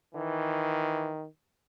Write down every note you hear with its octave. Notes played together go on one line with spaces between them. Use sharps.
D#3 E3